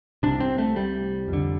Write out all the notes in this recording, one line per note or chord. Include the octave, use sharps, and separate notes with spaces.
C2 C3 D4
C4
A3
G3
F2
D3